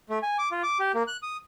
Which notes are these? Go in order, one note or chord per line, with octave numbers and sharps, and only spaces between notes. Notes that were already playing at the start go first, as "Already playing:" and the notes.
A3
G#5
D6
F4
D6
G4
A#3
F#6
D#6